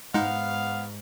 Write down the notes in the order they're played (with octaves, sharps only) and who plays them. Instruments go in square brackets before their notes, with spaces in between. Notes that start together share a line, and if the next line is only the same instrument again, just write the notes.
[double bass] G#2 [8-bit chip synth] G#3 D#4 [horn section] B3 F5 [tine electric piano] F#5